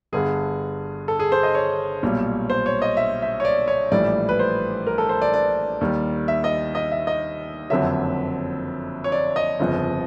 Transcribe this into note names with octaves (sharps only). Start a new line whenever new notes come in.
G1 G2 D3 G#4
A4
G#4
C5
D#5
C#5
B1 A#2 G3
C5
C#5
D#5
E5
E5
C#5
D5
C#5
A#1 A2 E3 G3 D5
B4
C5
A#4
A4
C5
D5
D5
D#2 D#3 G3
E5
D#5
D#5
E5
D#5
F#1 F2 D3 F#3 E5
C#5
D5
D#5
G1 F2 C#3 F3